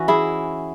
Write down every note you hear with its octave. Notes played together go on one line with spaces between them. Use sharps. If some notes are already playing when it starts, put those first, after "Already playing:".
Already playing: E3 C#4 F#4
E4 G#4